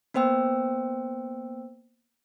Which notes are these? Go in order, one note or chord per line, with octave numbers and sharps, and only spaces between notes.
A#3 B3 C5 G5 E6